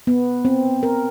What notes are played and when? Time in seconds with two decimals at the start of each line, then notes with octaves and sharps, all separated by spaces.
0.07 B3
0.45 C4
0.83 A#4